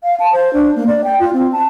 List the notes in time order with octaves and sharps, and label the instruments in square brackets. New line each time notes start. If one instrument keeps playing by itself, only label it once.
[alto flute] F5
A5
C5
D4
A#3
D5
G5
F4
C4
A5